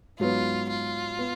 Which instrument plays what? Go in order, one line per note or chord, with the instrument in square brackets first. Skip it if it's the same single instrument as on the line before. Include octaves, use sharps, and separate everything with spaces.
[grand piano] G#2 F#3 B3 [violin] F4
[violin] F4
[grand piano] B3